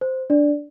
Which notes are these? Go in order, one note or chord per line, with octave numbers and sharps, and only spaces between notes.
C5
D4 D5